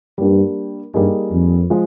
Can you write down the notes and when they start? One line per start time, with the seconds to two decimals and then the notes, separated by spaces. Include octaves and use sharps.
0.18 G2 G3 A#3 D4 G4
0.94 G2 G3 A#3 D#4 G#4
1.32 F2
1.70 F3 G#3